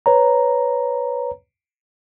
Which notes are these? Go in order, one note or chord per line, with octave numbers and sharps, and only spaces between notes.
B4 C#5 A#5